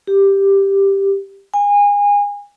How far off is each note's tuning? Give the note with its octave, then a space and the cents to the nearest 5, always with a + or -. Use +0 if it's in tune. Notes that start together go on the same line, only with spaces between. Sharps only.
G4 +5
G#5 -30